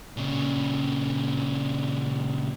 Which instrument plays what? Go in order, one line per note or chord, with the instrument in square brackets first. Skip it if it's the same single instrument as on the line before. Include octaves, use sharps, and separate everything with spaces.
[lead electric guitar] A#2 C#3